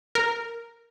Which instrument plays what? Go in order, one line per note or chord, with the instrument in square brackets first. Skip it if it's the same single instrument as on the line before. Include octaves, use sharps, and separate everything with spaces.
[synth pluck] A#4